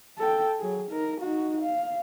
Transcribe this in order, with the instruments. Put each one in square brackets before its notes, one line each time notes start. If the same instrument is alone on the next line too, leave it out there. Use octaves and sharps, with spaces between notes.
[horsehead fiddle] A4 G5
F#3 G#4
D#4 A#4
D#4 F#4
F5